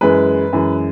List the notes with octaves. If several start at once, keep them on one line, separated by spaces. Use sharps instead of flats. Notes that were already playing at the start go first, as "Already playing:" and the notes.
F#2 E3 G#3 B4
F#2 E3 G#3